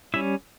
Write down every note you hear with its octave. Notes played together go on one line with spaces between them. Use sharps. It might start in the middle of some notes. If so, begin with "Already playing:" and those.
G3 C#4 E4 E5